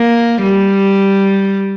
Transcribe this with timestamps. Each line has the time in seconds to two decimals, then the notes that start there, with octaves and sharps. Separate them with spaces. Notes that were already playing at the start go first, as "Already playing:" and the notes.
Already playing: A#3
0.42 G3